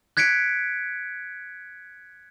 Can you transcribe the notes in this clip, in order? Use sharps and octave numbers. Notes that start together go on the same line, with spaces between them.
F#6 G#6 B6 C#7 D7